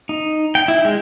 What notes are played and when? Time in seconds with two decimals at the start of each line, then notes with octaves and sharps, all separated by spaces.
0.09 D#4
0.55 G5
0.68 E4
0.85 G#3